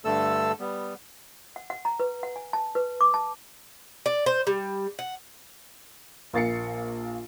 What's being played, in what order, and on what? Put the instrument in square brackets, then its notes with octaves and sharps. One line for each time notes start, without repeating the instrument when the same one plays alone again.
[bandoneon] G2 D3 A3 A4 E6
G3 B3
[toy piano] F#5
F#5
A#5
B4
F#5
G#5
A5
B4
D6
A5
[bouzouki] D5
C5
G3
F#5
[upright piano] A#1 A#3 A6 C7 C#7